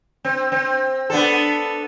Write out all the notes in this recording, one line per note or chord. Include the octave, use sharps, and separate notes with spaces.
C4
C4
B3 D4 A4